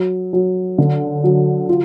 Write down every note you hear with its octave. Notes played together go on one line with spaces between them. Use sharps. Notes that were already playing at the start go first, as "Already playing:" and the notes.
Already playing: F#3
F#3
D3
F#3
F4